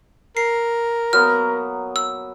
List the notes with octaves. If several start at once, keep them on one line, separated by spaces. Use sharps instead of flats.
A#4 C7
F#3 A#3 B3 F6
E6